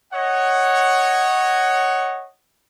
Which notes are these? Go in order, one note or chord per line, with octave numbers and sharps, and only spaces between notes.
C#5 D#5 F#5